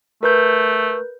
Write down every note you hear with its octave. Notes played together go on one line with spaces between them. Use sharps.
A3 A#4 B4 G6